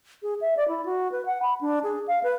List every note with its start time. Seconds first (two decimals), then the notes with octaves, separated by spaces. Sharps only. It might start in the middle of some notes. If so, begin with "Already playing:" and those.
0.23 G#4
0.41 E5
0.57 D5
0.68 E4
0.85 F#4
1.12 B4
1.26 F#5
1.42 B5
1.61 D4
1.83 G#4
2.08 F5
2.23 B4